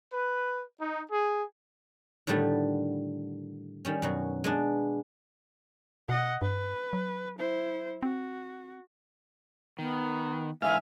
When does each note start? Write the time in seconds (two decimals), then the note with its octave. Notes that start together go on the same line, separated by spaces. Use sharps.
0.12 B4
0.79 D#4
1.10 G#4
2.27 A2 D3 D#3 G3 A3 B3
3.85 D#3 G3 C#4
4.02 F#2 B2 F#3
4.44 G#3 B3 D4
6.09 B2 D#5 F#5
6.42 G2 B4
6.93 F#3
7.39 E4 C5
8.03 C4 F#4
9.79 D#3 B3
10.62 G#2 D3 E3 E5 F5 G#5